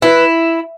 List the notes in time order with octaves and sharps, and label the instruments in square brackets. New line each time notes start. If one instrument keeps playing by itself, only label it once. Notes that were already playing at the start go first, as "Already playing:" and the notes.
[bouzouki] E4 [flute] B4